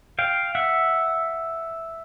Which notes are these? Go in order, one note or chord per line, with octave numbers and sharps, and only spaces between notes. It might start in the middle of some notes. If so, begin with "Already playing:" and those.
F5 G5
E5 F#5